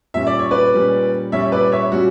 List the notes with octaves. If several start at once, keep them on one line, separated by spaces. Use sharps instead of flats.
A#2 G3 C#4 E5
D5
C#5
B4 D5
A#2 G3 C#4
A#2 G3 C#4 C#5 E5
B4 D5
C#5 E5
A#2 G3 C#4 F#4